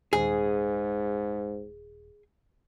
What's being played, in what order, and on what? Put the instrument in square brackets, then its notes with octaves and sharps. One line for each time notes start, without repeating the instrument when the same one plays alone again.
[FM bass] D#1 [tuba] G#2 [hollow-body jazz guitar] G#4